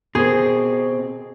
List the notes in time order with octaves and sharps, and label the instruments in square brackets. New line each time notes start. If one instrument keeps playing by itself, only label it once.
[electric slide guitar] B2 C4 [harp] G#4